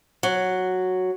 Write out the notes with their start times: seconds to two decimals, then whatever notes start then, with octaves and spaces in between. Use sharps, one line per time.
0.23 F#3